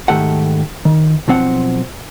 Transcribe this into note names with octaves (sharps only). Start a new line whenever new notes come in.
G#2 D#3 A3 G4 A4 F#5
D#3
B1 F3 C4 F#5